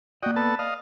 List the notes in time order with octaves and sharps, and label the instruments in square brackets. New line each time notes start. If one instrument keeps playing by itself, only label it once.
[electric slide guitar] A#3 D5 [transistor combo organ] F#4 D#5 G5
[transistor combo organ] B3 A4 A5
[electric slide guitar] D5 [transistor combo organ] D#5 F5